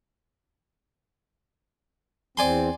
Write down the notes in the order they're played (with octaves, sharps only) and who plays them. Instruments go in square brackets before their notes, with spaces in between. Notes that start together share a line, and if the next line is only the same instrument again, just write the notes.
[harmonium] E2 C4 [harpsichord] D5 G#5 C6